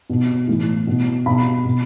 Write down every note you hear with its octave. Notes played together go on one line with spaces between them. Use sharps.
B2
A2 E3
B2
B2 B5
B2